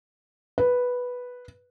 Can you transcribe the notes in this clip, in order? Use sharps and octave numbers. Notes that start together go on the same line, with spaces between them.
B4